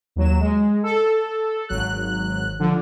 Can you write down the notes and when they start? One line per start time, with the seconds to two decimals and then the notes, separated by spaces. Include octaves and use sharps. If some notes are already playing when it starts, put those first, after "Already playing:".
0.16 D#2 F#3 E7
0.40 G#3
0.83 A4
1.69 G#1 F#3 F#6
2.59 D3 F3